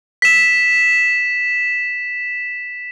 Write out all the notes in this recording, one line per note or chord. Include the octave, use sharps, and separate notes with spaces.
B6 E7